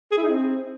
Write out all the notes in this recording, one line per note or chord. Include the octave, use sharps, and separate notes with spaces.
G#4
E4
D#4
C4